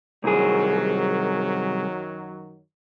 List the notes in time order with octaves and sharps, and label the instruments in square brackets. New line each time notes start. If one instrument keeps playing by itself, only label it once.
[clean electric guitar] C2 G#4 [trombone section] F#2 D#3 F#3